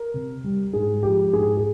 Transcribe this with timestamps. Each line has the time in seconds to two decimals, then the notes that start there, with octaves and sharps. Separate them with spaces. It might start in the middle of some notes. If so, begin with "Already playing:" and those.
Already playing: A#4
0.14 C3
0.44 G3
0.73 G#2 G#4
1.03 F3 G#3 G4
1.33 G#2 G#4
1.57 G#4